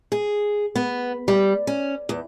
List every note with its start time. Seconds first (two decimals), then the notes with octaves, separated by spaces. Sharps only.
0.12 G#4
0.76 B3
1.28 G3
1.67 C#4
2.09 E2